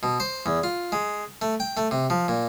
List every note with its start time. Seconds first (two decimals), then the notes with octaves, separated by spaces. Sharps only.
0.03 B2
0.20 C5
0.46 E2
0.64 F4
0.92 G#3
1.42 A3
1.60 G5
1.77 A3
1.91 C3
2.10 F3
2.28 A#2